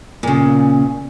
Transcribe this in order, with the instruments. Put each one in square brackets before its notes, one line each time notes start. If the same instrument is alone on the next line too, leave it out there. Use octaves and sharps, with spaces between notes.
[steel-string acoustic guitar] A#2 C#3